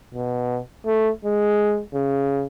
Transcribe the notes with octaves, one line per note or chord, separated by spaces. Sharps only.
B2
A3
G#3
C#3